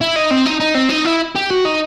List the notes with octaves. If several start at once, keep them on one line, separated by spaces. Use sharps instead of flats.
E4
D#4
C4
D#4
D#4
C4
D#4
E4
G4
F#4
D#4